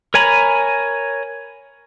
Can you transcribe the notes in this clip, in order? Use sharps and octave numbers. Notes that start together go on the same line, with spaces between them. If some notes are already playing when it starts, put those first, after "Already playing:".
A#4 C#5 G#5 A#5 B5